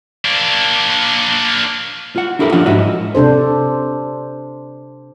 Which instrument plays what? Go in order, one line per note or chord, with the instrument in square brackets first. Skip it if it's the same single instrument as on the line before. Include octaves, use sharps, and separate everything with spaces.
[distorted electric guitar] A#3 D4
[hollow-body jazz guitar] F4 F#5
D4 E4 G4 A4 A#4
F3 C#4 D4 F4 F#5
G#2 E4 F#4 D#5 E5
[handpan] C3 D4 A4 C5